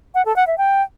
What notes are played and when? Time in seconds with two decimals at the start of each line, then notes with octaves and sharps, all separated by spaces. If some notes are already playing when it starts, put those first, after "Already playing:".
0.15 F#5
0.25 A4
0.36 F#5
0.47 E5
0.58 G5